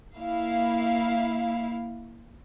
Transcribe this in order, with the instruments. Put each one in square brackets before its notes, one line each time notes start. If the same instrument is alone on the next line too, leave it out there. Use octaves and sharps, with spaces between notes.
[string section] A#3 E4 F5